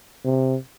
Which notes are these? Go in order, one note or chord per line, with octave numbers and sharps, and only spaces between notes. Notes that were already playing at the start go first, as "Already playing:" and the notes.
C3